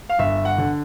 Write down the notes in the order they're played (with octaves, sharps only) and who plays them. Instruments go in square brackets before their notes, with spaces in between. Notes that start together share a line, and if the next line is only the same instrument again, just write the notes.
[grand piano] F5
G1 E5
F#5
D3